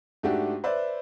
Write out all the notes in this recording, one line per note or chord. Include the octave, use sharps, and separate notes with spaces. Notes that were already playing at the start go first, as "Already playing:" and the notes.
G#2 A3 D4 F#4 G4
B4 C5 D5 E5